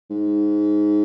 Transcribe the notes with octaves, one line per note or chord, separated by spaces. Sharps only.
G#2